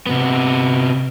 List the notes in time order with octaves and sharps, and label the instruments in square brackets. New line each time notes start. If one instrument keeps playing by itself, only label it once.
[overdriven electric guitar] C3 B3